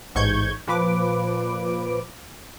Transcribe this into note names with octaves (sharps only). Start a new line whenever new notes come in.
A1 G#2 C#6 G6 G#6
A#2 F3 B4 D6